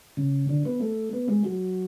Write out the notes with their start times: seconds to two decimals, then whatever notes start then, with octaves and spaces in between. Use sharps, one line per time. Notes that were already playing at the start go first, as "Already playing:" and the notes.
0.17 C#3
0.49 D3
0.65 B3
0.81 A3
1.13 B3
1.28 G#3
1.44 F#3